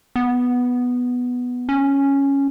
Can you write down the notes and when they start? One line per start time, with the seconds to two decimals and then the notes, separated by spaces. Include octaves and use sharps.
0.16 B3
1.69 C#4